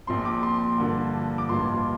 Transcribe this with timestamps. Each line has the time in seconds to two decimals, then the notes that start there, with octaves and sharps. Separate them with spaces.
0.07 A#1 A#2 F3 C4 C6
0.25 D6
0.43 C6
0.78 G2 D3 F3 A#3
1.38 D6
1.49 A1 G2 F3 A#3 C6